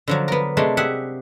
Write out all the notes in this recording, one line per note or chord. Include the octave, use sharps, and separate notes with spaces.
D3 F3 F#3
B3 A#4
C3 G#3 A3 D4
G4 G#4 E5 F#5